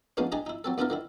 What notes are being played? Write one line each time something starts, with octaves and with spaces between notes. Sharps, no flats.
F3 G#3 A#3 B3 C#4 D4
D4 D#4 G4 G#4 D#5 G#5
D#4 E4
F#3 C4 A4
D#2 B3 D4 E4 F4 A#4
D3 D#3 E4